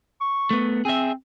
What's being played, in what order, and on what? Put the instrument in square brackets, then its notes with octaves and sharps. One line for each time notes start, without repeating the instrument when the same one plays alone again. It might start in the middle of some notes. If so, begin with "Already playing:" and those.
[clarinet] C#6
[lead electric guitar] A3 B3
[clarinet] C4 [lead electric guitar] G#4 E5